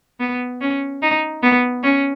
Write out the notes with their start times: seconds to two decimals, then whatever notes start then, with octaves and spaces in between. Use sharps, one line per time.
0.20 B3
0.61 C#4
1.02 D#4
1.43 B3
1.83 C#4